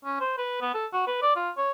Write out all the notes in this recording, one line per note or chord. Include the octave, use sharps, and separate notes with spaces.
C#4
C5
B4
B3
A4
F#4
B4
D5
F4
C#5